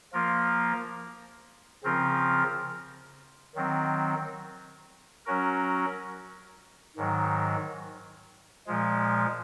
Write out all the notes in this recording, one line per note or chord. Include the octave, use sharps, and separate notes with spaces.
F3 A#3 F4 A#4
C#3 F3 C4 F4 A#4
D#3 F#3 C4
F#3 C#4 F#4 A#4
G#2 D#3 F#3
A#2 F3 G#3